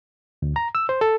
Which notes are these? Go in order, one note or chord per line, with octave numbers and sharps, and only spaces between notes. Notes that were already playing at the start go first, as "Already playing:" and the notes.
D2
A#5
E6
C5
A4